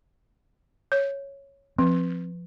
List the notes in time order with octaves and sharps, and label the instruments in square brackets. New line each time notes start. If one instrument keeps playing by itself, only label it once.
[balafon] C#5
[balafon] F3 [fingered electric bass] C4